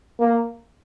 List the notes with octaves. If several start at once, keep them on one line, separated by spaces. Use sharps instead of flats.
A#3